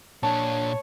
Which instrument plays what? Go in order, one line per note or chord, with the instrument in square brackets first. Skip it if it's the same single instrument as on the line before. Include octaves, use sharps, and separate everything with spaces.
[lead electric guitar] A#2 D4 [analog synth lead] C#5 [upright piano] A5